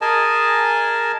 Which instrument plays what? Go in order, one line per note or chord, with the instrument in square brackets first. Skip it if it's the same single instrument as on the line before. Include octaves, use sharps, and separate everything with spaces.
[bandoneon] G#4 A#4 D#5 G#5 A5